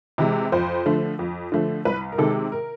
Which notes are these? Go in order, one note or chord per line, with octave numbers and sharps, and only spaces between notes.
C3 E3 G#3
F2 C5
D3 F3 A3
F2
D3 F3 A3
C2 B4
A#4
C3 D#3 G#3 A4
A#4